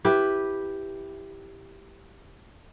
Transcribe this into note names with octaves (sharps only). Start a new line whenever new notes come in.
E4 G4 B4